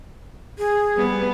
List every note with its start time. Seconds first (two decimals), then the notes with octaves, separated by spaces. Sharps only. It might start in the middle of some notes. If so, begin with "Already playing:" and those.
0.58 G#4
0.94 G3 B3